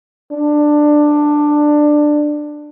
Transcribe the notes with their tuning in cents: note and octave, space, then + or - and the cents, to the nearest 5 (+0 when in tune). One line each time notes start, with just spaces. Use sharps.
D4 +15